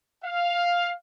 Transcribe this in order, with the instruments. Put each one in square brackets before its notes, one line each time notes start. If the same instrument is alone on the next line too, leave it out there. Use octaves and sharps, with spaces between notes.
[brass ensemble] F5